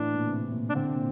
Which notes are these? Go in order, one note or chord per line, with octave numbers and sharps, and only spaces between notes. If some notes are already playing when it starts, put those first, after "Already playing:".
Already playing: A2 E3 D4
A#2
C3
A#2
D4
D3 C4
C3
A#2